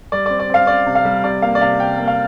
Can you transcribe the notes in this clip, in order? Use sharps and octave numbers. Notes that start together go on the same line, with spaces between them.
G3 D5
C4 D5
D5
C4 F5
C4 D5
C3
F5
G3
C3 D5
A#3 F5
D5
C3 F5
C3 G5
A#3
F5